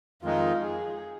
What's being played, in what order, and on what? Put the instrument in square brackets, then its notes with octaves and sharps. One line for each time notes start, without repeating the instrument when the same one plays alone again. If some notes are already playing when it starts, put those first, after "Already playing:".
[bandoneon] F2 D#3 G#3 D#4 [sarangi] F4
[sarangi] G#4